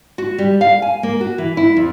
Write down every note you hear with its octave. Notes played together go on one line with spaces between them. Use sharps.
F#4
G3
F5
G#5
A#3
F#4
E3
E4
F2